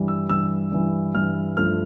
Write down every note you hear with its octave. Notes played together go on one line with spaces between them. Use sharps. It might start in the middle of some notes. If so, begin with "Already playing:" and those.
Already playing: G2 E3 G3
E6
G2 E3 G3 E6
G2 E3 G3
G2 E3 G3 F6
G2 F3 A3 F6